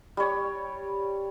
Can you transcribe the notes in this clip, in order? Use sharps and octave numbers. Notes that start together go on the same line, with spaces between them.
G3 C#5